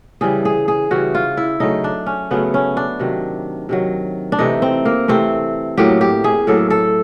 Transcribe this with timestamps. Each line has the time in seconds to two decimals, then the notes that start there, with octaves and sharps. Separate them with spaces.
0.21 C#3 E3 G3 G#4
0.45 G#4
0.68 G#4
0.91 C#3 E3 G3 F#4
1.15 F4
1.37 E4
1.60 C#3 F#3 A3 D#4
1.84 D4
2.06 C#4
2.31 C#3 F#3 A3 B3
2.54 C#4
2.77 D4
3.00 C3 D#3 F#3
3.69 C3 D#3 F#3
4.32 D4
4.39 C3 E3 A3 D#4
4.62 C4
4.85 A#3
5.08 C3 E3 A3 C4
5.78 A2 F#3 A#3 G4
6.01 G4
6.24 G#4
6.47 A2 F#3 A#3 A4
6.70 A4